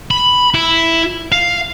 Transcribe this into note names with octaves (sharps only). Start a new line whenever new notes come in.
B5
E4
F5